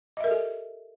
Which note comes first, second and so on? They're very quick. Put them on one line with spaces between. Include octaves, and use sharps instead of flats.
D#5 E5 A#4 A4 G4